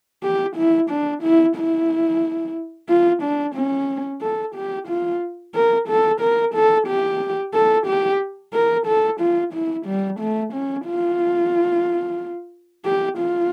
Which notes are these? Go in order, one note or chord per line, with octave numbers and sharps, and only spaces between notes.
G4
E4
D4
E4
E4
F4
D4
C#4
A4
G4
F4
A#4
A4
A#4
A4
G4
A4
G4
A#4
A4
F4
E4
G3
A3
C#4
F4
G4
F4